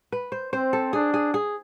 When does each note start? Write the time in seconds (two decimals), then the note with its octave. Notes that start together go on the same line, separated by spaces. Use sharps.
0.12 B4
0.32 C5
0.53 C4 C5
0.73 A4
0.93 D4 G#4
1.14 G#4
1.34 G#4